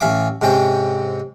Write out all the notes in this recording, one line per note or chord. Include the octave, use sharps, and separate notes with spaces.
A1 C#4 E5 F5 D6
G#2 C3 C4 C#4 G5